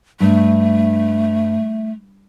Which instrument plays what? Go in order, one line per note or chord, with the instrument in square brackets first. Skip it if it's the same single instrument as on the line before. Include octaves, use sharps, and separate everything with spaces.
[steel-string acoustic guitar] G2 [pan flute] A3